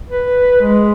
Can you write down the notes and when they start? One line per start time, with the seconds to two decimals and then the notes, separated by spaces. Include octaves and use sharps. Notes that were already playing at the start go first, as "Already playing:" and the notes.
0.10 B4
0.61 G#3